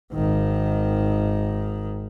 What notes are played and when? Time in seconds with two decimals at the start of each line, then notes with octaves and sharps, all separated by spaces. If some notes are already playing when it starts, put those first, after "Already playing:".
0.13 G#1 D#3